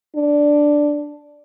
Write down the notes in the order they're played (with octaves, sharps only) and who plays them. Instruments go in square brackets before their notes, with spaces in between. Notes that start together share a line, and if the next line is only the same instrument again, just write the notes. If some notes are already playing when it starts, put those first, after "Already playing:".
[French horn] D4